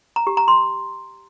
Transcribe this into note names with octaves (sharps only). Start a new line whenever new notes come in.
A#5
G4
A#5
C6